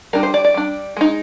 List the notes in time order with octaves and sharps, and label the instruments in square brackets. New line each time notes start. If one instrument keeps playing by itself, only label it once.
[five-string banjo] G3 D4 A#4
C5
D5
D5
G3 D4
G#3 D#4